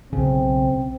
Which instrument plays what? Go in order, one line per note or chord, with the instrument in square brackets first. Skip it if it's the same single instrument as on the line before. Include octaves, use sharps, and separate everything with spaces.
[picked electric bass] B1 C#3 [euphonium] C4